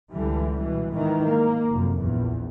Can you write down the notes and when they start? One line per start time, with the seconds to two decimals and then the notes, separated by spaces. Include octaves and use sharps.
0.12 C#2 D3 E3 G3
0.59 B2 E3
0.92 G#2 D#3 E3
1.25 A#3
1.70 F1 F#2
1.99 A#1 E2